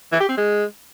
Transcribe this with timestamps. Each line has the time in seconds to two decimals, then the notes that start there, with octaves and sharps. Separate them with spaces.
0.12 E3
0.21 G4
0.29 C4
0.37 G#3